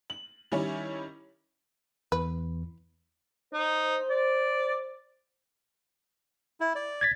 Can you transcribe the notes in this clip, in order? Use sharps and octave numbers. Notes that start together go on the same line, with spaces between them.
F#7
D#3 G3 C#4 E4 C#5
E2 E3 B4
D#4 C5
D5
E4
D5
G#6 A6 B6